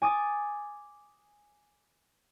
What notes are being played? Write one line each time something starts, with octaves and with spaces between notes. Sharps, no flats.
G#5 D6 D#6 A6